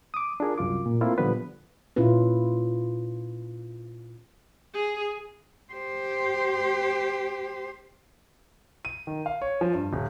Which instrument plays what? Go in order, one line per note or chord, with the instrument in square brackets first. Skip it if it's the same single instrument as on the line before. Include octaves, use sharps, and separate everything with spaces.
[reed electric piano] D6 D#6
D4 F4 G#4 A#4
C2 F#2 F4 D6
A#2
A3 A#3 C4 E4 F4
A#2 D3 F3 G3 B3 B4
[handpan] A#2 C#4 E4 F4 B4
[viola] G#4
[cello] G4 C5
[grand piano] D#7
D#3
F5
C#5
F3
G2
D#1